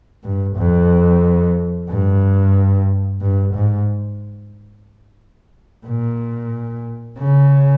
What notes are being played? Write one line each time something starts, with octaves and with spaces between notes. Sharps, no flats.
G2
F2
G2
G2
G#2
A#2
C#3